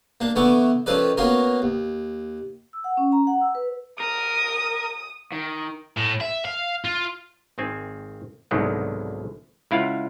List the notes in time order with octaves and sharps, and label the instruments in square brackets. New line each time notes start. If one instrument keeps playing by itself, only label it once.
[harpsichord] A#3 D4
D3 E3 A3 B3 C#6 D6
D#3 F3 C#4 A4 B4 D5
A#3 B3 C#4 F#4 A#4
D#2
[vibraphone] E6
F#5
C#4
A#5
F#5
E6
B4
[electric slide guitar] A#4 [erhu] D#6
[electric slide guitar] D#3
[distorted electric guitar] A2
E5
F5
F4
[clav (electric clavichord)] G#1 D#3 C4 G#5
C2 G#2 B2 D3 D#3 F#3
C#2 E4 F4 F5 F#5